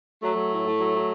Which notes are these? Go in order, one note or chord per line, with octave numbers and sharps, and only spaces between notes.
F#3 A3
F#3
A2
A2
F#3
F#3